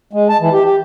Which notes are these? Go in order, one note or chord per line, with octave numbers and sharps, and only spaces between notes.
G#3
A5
E3
G4
G4